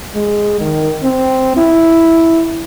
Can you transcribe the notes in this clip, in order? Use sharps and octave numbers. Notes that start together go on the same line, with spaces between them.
G#3
D#3
C4
E4